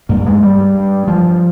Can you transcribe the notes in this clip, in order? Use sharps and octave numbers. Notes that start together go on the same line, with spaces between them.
G2 A#3
G#3
G2 G3
G2
G2 F3